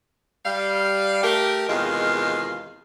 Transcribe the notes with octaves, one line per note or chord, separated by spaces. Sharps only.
G3 F5
A3 G4 A#4
E2 C3 D#3 G#3 F4 F5